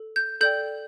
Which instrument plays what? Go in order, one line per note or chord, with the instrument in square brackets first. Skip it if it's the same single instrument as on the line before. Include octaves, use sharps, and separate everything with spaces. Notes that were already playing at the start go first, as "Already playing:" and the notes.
Already playing: [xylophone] A4
G6
A4 D5 G5 G6